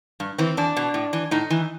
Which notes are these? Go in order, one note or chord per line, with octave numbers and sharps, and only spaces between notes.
G2
E3 C4
E2 D4
B2
A2
E3
A2 D#4
E3